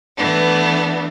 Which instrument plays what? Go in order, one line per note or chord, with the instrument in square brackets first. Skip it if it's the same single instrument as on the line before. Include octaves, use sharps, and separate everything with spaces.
[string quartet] E3 A3 B3 D4